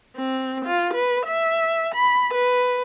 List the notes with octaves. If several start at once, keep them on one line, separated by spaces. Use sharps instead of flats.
C4
F4
B4
E5
B5
B4